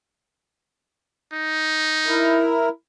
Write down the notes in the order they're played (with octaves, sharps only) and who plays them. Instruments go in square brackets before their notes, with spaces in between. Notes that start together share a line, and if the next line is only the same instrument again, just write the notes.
[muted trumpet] D#4
[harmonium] E4 A#4